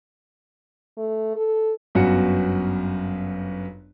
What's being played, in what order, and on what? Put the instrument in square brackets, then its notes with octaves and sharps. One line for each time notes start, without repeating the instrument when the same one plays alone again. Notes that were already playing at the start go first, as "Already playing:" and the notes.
[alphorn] A3
A4
[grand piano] G1 F#2 B3 F#4 C#7